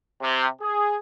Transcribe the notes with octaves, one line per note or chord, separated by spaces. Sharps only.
C3
G#4